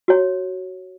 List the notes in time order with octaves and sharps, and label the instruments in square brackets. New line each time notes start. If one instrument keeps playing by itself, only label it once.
[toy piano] F#4 C#5